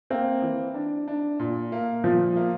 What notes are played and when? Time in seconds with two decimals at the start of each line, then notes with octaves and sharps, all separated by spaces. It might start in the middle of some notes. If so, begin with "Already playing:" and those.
0.10 A#3 C4
0.42 E3
0.74 D4
1.08 D4
1.40 A#2
1.72 A#3
2.04 A#2 F3
2.36 A#3